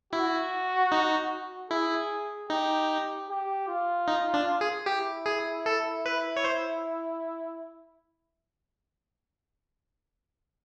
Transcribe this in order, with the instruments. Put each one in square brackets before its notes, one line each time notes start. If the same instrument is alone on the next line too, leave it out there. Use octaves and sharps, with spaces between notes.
[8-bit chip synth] E4 [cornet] F#4
[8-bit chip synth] D#4
[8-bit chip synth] E4 [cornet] G#4
[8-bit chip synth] D#4 [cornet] G4
[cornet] G4
F4
[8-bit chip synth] D#4
D4
G#4
[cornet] E4 [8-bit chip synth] G4
[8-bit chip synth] G#4
A4
B4
C#5
C5